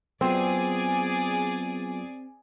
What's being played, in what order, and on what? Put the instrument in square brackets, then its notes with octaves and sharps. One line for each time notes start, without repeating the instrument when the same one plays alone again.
[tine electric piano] F#3 B3 F4 [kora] C4 [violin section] G#4 D5